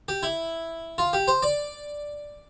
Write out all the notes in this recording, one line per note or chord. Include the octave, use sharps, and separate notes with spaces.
G4
E4
F4
G4
C5
D5